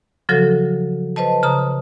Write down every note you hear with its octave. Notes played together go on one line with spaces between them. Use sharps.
C#3 F3 F#3 F#4 A4
B4 C5 D#5 A5
C#3 A#5 D#6